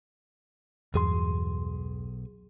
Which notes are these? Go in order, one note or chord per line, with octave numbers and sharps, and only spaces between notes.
B1 E2 G2 F#3 G#4 C6